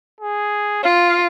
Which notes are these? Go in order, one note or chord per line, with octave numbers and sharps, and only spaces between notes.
G#4
F4 F5